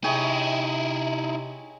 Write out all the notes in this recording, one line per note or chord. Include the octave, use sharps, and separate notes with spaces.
C3 D#4 E4 G#4 C#5 G5